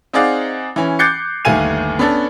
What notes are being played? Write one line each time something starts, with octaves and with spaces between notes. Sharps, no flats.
C4 D#4 G#4 D5 F5 F#5
E3 C#4
D6 F#6 G6 A6 C7 C#7
G1 D#2 A3 F5 G#5 D#7
B3 C#4 D4 A4